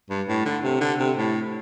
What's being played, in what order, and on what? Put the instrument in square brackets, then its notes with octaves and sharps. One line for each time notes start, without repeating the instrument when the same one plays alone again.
[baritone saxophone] G2
A2
D3
C3
D3
C3
A2